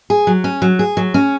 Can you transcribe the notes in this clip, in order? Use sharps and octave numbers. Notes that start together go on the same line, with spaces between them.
G#4
F#3
C#4
F#3
G#4
F#3
C#4